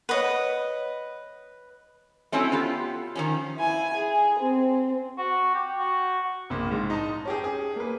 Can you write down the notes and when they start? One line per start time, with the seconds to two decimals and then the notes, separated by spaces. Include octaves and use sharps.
0.09 B4 C#5 D#5 F#5
2.32 A3 C4 C#4 E4 F#4
2.52 B3 F4 G4
3.15 D#3 F3 C#4
3.57 E4 G#5
3.94 G#4
4.39 C4
5.18 F#4
5.54 G4
5.78 F#4
6.50 A#1 A#2
6.71 G#2
6.90 D#4 A5
7.25 C#4 G4 G#4
7.44 G#4
7.76 A#3 B4